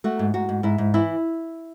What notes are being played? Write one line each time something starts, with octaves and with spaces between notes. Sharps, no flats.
A3 F#4
G#2
G#2 F#4
G#2
G#2 E4
G#2
E3 E4